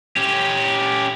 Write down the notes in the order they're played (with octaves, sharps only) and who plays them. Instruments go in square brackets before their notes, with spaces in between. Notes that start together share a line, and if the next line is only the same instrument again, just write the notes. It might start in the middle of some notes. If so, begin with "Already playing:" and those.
[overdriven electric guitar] C#4 G4